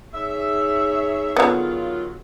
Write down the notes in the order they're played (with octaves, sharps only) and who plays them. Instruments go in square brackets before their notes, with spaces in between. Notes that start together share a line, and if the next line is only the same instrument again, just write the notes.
[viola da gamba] D#4 G#4 C#5 [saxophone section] E5
[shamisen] D3 B3 [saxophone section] D#3 F#3 F4